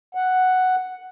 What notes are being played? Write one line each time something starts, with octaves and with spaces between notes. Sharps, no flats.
F#5